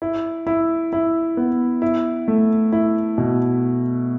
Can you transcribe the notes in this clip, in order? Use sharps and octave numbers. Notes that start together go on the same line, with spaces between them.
E4
E4
E4
B3
E4
A3
E4
B2